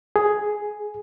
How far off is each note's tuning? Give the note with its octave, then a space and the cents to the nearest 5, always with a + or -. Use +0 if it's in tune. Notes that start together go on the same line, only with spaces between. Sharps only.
G#4 +5